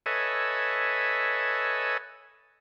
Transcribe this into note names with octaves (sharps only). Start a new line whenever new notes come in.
A4 B4 C#5 D#5 E5 G#5